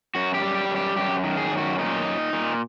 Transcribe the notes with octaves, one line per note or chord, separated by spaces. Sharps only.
F#2 F#4
G4
G3
G4
F#2
G4
F#2 G4
D#3
G#4
F#2
F#4
A#2 D#4
A#2
A#2